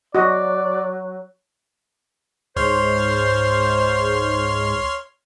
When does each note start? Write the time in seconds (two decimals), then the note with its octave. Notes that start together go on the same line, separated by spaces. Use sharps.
0.15 F#3 F#4 D5 D#5
2.56 C#2 G#2 C5 C#5 C6 F6